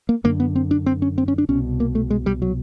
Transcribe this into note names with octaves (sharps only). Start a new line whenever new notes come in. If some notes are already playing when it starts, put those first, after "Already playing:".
A#3
F#2 D3 A#3
B3
C4
D4
C4
C#4
C4
C#4
D4
C2 B2 C#4
A#3
A3
G#3
G3
F#3